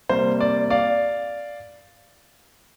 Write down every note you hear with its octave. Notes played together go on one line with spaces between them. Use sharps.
C3 G3 A#3 C5
D5
D5 F5